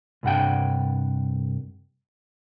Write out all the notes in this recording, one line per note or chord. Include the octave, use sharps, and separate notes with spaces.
C2 G2 F#5 G5